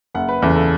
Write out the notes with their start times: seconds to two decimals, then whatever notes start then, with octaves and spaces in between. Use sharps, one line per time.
0.15 F#1 F#5
0.29 B4
0.42 E2 C#3 A4
0.56 A4